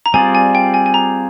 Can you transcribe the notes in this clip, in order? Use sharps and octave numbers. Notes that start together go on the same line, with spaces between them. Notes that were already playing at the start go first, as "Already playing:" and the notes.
A#5
G3 C4 F4 G#4 D5 G#5
G#5
G5
G#5
G#5
A#5